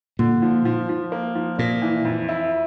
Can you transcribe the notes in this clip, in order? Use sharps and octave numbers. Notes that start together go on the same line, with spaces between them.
A#2 D3
F3
F3
F3
A#3
F3
A#2 A#3
E3
F2
E4